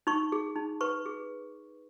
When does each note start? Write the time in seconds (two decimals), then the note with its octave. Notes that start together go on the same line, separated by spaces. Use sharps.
0.07 D#4 C#6
0.32 G#4
0.56 D#4
0.81 B4 C#6
1.06 G#4